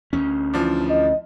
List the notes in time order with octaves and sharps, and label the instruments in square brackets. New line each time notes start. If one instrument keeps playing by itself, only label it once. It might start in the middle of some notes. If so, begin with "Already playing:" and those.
[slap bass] D2 C#4
[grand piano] E3 F3 D4
[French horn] D#5